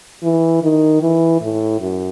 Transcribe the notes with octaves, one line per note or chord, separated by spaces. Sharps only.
E3
D#3
E3
A2
F#2